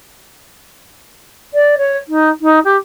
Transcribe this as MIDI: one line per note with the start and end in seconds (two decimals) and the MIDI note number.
1.53 1.75 74
1.77 1.97 73
2.08 2.29 63
2.41 2.59 63
2.64 2.76 67